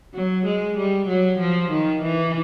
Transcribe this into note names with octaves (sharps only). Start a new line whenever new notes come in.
F#3
G#3
G3
F#3
F3
D#3
E3